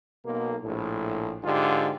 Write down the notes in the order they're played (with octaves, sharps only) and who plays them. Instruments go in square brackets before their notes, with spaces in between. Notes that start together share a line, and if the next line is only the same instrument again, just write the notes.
[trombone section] B1 A#3
A#1 A2
G#2 D3 F4 G4